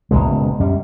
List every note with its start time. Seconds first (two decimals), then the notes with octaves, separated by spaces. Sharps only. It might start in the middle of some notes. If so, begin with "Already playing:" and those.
0.11 F#1 C#2 B2 G#3
0.60 F#2 G3